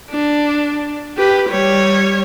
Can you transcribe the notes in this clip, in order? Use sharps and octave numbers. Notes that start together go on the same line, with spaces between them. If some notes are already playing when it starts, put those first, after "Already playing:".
D4
G4 B4
G3 C#5